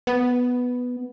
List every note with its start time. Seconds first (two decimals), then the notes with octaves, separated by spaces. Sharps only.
0.07 B3